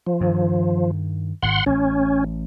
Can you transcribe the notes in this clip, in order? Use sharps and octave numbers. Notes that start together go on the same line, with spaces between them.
F3
G2 D#3
G#1 G#2 F#5 C6
A1 C#4